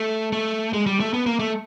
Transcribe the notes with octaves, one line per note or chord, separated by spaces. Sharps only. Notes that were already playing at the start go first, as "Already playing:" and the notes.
Already playing: A3
A3
G#3
G3
A3
B3
A#3
A3